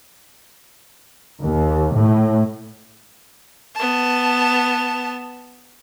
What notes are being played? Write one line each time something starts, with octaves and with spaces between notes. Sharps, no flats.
D#2
A2
B3 A5